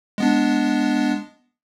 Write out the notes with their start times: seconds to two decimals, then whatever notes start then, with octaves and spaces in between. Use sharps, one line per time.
0.18 G#3 B3 D4